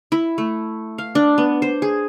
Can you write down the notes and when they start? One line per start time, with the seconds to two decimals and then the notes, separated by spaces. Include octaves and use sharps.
0.12 E4
0.38 A3
0.98 F5
1.15 D4
1.38 B3
1.62 C5
1.82 G#4